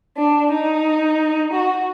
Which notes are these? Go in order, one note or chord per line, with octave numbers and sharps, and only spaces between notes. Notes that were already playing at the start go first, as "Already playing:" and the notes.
D4
D#4
F#4